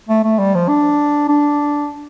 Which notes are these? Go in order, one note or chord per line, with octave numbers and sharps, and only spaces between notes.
A3
A3
G3
F3
D4
D4